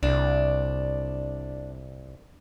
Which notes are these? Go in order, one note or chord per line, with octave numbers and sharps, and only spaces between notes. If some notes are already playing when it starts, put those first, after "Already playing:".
C2 D4